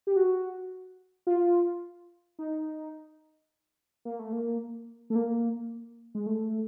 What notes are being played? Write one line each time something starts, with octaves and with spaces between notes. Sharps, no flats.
G4
F#4
F4
D#4
A#3
A3
A#3
A3
A#3
G#3
A3